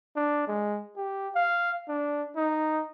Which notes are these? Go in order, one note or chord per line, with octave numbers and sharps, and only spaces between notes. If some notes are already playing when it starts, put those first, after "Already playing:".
D4
G#3
G4
F5
D4
D#4